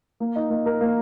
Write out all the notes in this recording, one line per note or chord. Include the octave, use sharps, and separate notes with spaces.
A#3
D#4
A#3
A#4
A#3